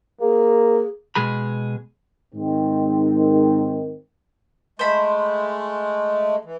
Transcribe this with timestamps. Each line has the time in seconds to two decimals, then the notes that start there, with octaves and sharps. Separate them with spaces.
0.21 A#3 G#4
1.15 B2 G#3 G#4 B5
2.35 G#2 D#3 C4
4.79 G#3 A3 C5 B5
6.45 E3